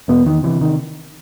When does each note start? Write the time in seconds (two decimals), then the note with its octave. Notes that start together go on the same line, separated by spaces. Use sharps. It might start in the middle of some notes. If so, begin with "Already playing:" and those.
0.08 E2 B2 B3
0.26 D#3
0.43 C3 E3
0.61 D#3